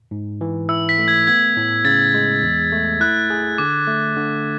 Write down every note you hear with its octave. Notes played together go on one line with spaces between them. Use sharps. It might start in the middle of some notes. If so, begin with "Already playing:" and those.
G#2
E3
E4 E6
B6
A3
G#6
B3 G#6
A2
C#3 A6
G#3
E2
A3
E4 F#6
G#4
D3 D6
A3
D3